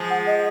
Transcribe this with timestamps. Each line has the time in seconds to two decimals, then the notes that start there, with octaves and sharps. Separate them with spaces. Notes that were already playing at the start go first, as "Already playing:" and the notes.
Already playing: F3 G#3
0.10 F#5
0.27 D#5